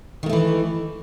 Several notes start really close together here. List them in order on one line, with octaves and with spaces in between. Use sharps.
D#3 A#3 A3 E3